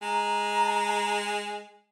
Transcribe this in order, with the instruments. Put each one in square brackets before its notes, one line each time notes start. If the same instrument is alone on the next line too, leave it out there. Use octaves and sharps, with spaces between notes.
[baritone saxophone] G#3 [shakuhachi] A#5